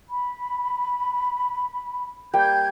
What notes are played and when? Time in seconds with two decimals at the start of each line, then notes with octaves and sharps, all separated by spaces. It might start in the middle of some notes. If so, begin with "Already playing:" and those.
0.09 B5
2.34 G3 A#3 G5 G6 G#6